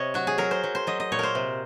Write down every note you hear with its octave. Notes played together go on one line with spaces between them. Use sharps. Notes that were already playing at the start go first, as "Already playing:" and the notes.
Already playing: C3 C#5 D#5
F#3 F#4
G#4
F#3 A#4
C5
F#3
C5
F#3 D#5
D#5
A#2 C#5
A#4 C5
C3